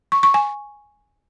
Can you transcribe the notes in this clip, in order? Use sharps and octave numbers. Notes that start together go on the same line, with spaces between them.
C#6
C#6
G#5